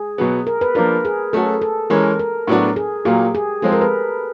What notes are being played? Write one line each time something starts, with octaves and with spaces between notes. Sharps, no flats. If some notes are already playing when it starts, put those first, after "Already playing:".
Already playing: G#4
B2 F#3 B3
A#4
B4
F3 A#3 D4 F4 A#4
G#4
F#3 A3 C#4 F#4 A4
A4
E3 G#3 C#4 A#4
A#4
A2 F#3 B3 D4 F#4
G#4
A#2 F#3 A#3 G4
G#4
F3 G#3 C4 A4
A#4
B4